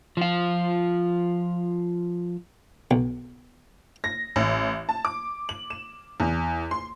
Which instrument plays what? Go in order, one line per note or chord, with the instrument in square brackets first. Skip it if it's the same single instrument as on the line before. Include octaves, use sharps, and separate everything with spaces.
[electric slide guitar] F3 F4
[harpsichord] B1
[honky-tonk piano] A#6
A1
A5
D6
F#7
E7
E2
C6